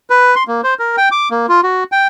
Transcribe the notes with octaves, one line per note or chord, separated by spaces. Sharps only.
B4
C6
A#3
C5
A#4
G5
D6
A#3
F4
F#4
G5